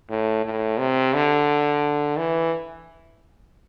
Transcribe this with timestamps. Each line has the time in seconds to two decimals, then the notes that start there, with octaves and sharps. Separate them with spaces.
0.10 A2
0.45 A2
0.79 C3
1.14 D3
2.17 E3